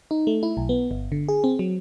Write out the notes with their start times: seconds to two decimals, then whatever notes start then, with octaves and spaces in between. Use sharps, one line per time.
0.11 D#4
0.27 A3
0.43 E4
0.57 B1
0.69 B3
0.91 G1
1.12 D3
1.29 G#4
1.44 C4
1.59 F#3